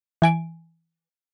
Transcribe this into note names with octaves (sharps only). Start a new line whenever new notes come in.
E3 G#5 D7